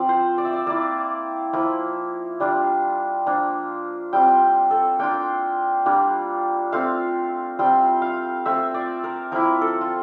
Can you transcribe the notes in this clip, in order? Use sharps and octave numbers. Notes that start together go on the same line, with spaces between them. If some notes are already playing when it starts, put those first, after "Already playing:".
Already playing: F3 C4 F4 D5
C5
D5
E5
D5
A#3 E4 D5
F3 A#3 E4
G3 D4 F4
F3 A#3 D4 F4
G3 C4 F4 G5
A4
A#3 D4 F4 G5
G3 A#3 D4 F4
A3 C4 F4 F5
G3 C4 F4 G5
F5
A3 C4 F4 E5
D5
A#4
F3 A#3 E4 A#4
A4
F4